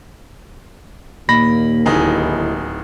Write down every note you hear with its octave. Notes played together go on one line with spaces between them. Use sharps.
D#2 A#2 A#3 D#5 B5 A#6
D1 D3 D#4 E4 G#4 D#5